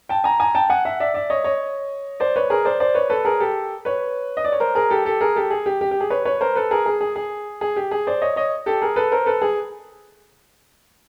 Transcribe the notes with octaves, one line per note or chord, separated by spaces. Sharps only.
G5 A5
G#5 A#5
G#5 A#5
G5 A5
F#5 G#5
E5 F#5
D5 E5
D5 E5
C#5 D#5
C#5 D#5
C5 D5
B4 C#5
G#4 A#4
C5 D5
C5 D5
B4 C#5
A4 B4
G#4 A#4
G4 A4
B4 C#5
D#5
D5
C#5
A#4 C5
G#4 A#4
G4 A4
G4 A4
G#4 A#4
G4 A4
G#4
G4
G4
G4
G#4
B4 C#5
B4 C#5
A#4 C5
A4 B4
G#4 A#4
G#4
G#4
G#4
G#4
G4
G#4
C5 D5
C#5 D#5
C#5 D#5
G4 A4
G#4 A#4
A4 B4
A#4 C5
A4 B4
G#4